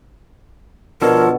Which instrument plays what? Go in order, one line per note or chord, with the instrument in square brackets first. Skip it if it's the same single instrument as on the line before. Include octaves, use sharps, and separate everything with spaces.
[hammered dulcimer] B2 D3 [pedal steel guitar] F3 A4 C#5 [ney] A#4